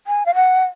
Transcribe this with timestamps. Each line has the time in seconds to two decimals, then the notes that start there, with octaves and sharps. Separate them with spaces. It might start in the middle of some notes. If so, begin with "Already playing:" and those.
0.07 G#5
0.26 F5
0.35 F#5